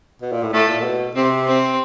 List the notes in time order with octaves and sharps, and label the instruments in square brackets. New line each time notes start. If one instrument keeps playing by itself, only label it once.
[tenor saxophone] B2
A#2
A2
[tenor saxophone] A2 [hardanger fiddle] A3
[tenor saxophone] A#2
A#2
B2
[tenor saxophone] C3 [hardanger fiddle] C4
[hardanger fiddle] C4